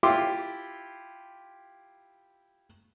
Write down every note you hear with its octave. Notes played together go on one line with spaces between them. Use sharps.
E4 F4 G4 G5 C6 D6